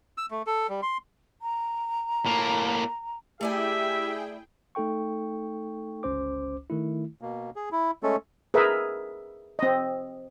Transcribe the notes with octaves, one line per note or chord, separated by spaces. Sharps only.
E6
A3
A4
G3
C6
A#5
A2 A#3
A3 E4 G4 G#4 D5 E5 G5 G#5
A3 D#4 A4 G5 C#6
G1 C#2 C#4 C5 D6
D#3 A3 E4
B2 A#3
G#4
E4
G#3 A3 C#4 A4
G#4 A#4 B4 E5
C4 D#5